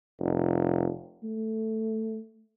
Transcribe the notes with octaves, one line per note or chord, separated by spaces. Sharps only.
F1
A3